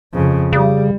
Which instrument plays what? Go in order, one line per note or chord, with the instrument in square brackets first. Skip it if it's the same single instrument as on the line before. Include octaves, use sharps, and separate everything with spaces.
[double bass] F2 C#3
[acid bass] C#3 [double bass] G3